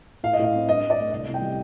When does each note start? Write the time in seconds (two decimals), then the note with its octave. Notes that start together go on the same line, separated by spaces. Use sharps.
0.23 A2 F5
0.33 D#5
0.39 A2 F5
0.54 C4
0.68 G2 D#5
0.83 G2
0.90 D5
0.98 A3
1.12 C2 D#5
1.27 C2
1.34 G5
1.41 G3